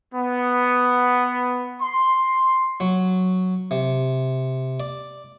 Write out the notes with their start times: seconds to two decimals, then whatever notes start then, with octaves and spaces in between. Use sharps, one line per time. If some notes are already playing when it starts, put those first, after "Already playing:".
0.14 B3
1.81 C6
2.80 F#3
3.71 C3
4.80 D5